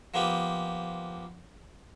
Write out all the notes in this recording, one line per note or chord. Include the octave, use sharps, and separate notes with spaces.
F3 A#3 B3 G4